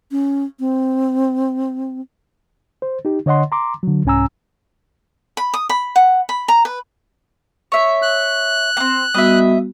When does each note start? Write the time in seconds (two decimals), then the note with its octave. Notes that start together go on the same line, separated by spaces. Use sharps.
0.11 C#4
0.60 C4
2.82 C5
3.05 D#4 G4
3.26 D3 C#5 D#5 F#5 C6
3.52 A#5 C6 D6
3.83 D3 F#3
4.05 C2 G#2 C#4 G#5 A#5 E6
5.37 B5
5.54 D#6
5.69 B5
5.96 F#5
6.29 B5
6.48 A#5
6.65 B4
7.72 C#5 E5
8.02 F#6
8.77 A#3 C4
9.14 G3 B3 F#4 D#5 E5